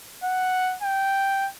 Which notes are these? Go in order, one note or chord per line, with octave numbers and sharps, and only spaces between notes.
F#5
G5